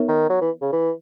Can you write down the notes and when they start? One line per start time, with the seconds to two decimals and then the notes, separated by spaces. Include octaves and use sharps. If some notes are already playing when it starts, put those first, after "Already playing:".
Already playing: B3 D#4 A#4 C#5 E5
0.08 D#3
0.29 F#3
0.41 E3
0.62 C#3
0.72 E3